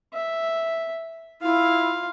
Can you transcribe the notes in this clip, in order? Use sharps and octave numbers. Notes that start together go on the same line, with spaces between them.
E5
E4 F4 F5